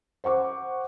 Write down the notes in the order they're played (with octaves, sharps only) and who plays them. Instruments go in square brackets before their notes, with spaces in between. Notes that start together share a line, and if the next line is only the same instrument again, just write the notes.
[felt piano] C5 F#5 C#6 D6